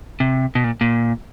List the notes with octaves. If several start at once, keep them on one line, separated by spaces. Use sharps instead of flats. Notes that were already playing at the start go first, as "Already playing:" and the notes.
C3
B2
A#2
A#2